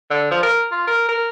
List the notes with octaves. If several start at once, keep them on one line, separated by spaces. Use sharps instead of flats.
D3
F3
A#4
F4
A#4
A#4